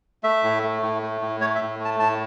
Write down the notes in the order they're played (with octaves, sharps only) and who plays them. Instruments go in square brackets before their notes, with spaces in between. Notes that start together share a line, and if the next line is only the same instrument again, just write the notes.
[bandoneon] A3 E5
A2
A3
A2
A3
A2
A3 C#5
E5
A2
A3
A5
A2 A5